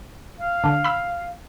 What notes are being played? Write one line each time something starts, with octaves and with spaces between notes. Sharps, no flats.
F5
D3
B5 E6